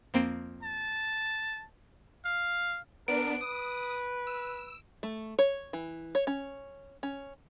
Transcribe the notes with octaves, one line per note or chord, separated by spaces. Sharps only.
F2 A#3 C4
A5
F5
B3 D4 A#4 D7
B4 D#6
E6
A3
C#5
E3
C#5
C#4
C#4